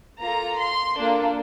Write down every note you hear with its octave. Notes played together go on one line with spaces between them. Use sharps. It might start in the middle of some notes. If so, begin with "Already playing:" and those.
A#3 F4 A4 A#5
C6
A#3 D4 F4 A4